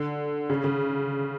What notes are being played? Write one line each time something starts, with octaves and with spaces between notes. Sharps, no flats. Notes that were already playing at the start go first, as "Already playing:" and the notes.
Already playing: D3
C#3
C#3